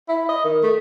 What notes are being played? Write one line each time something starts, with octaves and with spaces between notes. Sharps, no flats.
E4
D#5
D#3
A3